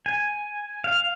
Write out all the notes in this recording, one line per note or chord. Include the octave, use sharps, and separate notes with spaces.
G#5
F5